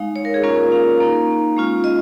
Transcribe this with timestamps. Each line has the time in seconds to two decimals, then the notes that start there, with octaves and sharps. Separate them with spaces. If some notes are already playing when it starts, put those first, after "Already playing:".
Already playing: G#3 D#4 F5
0.16 C#5
0.25 A#4
0.34 G#4
0.43 A#3 C#4 F4 A#4
0.72 F5
1.00 A#3 D#4
1.56 G#3 C#4 F4
1.84 D#5